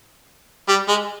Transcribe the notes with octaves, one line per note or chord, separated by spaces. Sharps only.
G3
G#3